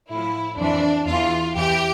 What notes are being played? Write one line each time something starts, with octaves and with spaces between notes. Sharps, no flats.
A2 F3 E4
F2 E3 D4
E2 E3 F4
E2 E3 G4